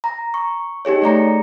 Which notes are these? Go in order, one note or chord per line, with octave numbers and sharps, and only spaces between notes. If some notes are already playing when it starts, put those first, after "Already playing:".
A#5
C#6
D#4 G4 G#4 C#5
A3 D5 A#5 C#7